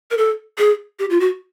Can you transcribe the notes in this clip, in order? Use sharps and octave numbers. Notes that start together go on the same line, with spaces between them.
A#4
A4
G#4
G4
F4
F#4